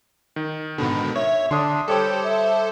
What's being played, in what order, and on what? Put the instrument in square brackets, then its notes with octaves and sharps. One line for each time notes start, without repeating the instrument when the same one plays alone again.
[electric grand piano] D#3
[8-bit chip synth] G#2 B2 D3 [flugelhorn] B3
[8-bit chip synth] C#5 [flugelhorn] E5
[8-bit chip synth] D3 [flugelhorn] D4 [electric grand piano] C6 D#6
[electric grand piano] G3 C#5 D6 [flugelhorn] G4 [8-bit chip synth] A4 C5
[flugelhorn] E5